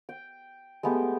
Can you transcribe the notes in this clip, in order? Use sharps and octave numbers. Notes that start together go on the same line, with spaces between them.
G5
G#3 A3 B3 G4